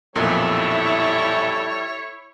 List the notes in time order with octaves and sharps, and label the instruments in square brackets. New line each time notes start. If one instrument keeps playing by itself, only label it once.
[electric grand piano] B1 F2 A#2 [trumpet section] G3 A4 [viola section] E4 E5 [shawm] C#5